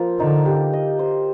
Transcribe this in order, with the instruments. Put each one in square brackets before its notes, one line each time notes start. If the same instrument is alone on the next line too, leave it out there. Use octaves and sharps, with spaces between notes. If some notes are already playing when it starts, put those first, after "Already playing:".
Already playing: [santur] F3 A#3 F4 C5
[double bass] D3 [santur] D#4
[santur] G4
D#5
C5